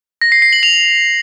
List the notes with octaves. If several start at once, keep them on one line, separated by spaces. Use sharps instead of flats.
A#6
C7
C7
F#7
F7